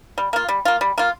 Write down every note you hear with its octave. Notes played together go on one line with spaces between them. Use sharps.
G3
A#3 F4
G3
A#3 F4
G3
A#3 F4